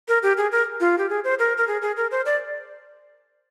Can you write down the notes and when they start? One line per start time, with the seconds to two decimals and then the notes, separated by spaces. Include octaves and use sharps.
0.08 A#4
0.23 G4
0.37 G#4
0.52 A#4
0.80 F4
0.98 G4
1.10 G#4
1.24 C5
1.39 A#4
1.57 A#4
1.68 G#4
1.82 G#4
1.97 A#4
2.11 C5
2.26 D5